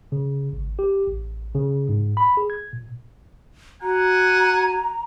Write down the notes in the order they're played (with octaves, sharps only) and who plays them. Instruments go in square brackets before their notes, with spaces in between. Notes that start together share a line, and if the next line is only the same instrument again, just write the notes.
[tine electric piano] C#3
G#1
G4
A1
C#3
G#2
B5
G#4
G#6
A#2
[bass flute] F#4 [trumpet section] F#5 G#5 [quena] A#5